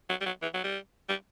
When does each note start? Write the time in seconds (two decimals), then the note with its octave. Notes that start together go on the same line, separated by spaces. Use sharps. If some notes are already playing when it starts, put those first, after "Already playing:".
0.09 F#3
0.21 G3
0.26 F#3
0.42 E3
0.54 F#3
0.64 G3
1.09 G3